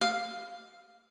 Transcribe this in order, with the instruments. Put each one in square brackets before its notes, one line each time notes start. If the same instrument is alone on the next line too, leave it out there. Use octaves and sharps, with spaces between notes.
[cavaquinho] F5